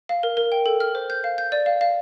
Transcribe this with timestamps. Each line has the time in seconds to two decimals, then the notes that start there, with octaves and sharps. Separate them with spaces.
0.09 F5
0.23 A#4
0.37 A#4
0.52 G5
0.66 A4
0.80 F6
0.95 C5
1.10 G6
1.24 F5
1.38 G6
1.52 D5
1.66 F5
1.81 F5